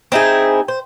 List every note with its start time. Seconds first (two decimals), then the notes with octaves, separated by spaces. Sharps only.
0.12 C4 D#4 E4 G#4
0.68 C5